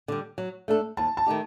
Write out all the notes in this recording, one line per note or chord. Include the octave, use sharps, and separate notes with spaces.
D3 G3
F#3
A3 D4 A4
D#2 A5
A5
D#3 A3 D#4 G4